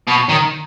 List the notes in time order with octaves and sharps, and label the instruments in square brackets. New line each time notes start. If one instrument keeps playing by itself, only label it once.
[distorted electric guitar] B2
D#3